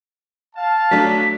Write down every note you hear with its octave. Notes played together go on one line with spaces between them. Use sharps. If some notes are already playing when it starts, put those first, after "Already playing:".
F5 A5
F#3 A3 D4 B6